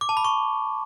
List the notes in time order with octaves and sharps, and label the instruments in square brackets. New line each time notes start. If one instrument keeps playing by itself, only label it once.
[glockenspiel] D6
A5
B5
C#6